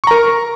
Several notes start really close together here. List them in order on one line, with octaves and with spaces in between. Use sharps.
C#6 A#5 A#4